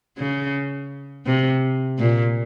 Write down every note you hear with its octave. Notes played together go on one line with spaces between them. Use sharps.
C#3
C3
A#2